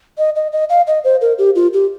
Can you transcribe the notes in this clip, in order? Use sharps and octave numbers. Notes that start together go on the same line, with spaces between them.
D#5
D#5
D#5
F5
D#5
C5
A#4
G4
F4
G4